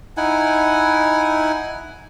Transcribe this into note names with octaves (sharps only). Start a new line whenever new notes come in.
D#4 E4 F#5 G#5